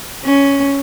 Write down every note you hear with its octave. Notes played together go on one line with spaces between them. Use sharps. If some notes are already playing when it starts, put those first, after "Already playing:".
C#4